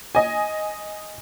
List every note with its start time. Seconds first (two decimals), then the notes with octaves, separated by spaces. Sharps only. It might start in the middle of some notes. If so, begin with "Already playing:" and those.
0.15 D#5 G#5